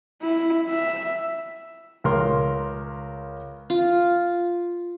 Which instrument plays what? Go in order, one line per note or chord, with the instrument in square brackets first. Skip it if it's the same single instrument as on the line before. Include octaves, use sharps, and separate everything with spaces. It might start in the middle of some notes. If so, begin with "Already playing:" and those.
[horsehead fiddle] E4
E5
[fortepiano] C#2 A#4 C6
[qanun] F4